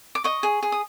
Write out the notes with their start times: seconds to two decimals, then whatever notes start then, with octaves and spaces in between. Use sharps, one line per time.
0.15 D6
0.24 D#5 C#6
0.43 G#4
0.63 G#4
0.72 D#6